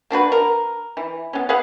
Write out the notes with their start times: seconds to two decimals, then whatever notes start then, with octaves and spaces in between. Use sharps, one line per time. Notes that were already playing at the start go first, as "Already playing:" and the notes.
0.10 A#3 D4 F#4 B4
0.32 A#4
0.97 E3
1.33 B3 C#4
1.49 G#4 B4 F5 F#5